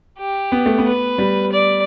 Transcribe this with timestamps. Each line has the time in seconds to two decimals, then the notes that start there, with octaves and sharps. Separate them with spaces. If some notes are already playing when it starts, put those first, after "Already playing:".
0.19 G4
0.52 B3
0.66 A3
0.79 B3
0.86 B4
1.18 G3
1.52 D5